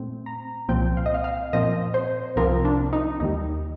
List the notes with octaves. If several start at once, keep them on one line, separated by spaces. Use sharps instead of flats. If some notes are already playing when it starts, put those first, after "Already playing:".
Already playing: A#2 A3 C4
A#5
C2 A#2 F3 C4 G5
F5
D#5
F5
F5
A#2 F3 C4 D#5
C5
C2 C3 F3 C4 A#4
D4
D#4
D#2 D#3 G3 D#4